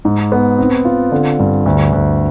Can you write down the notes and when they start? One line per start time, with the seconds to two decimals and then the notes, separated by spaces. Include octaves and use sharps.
0.05 G#2
0.32 B3
0.59 C4
0.85 F4
1.12 D3
1.39 G2
1.66 D2
1.93 D2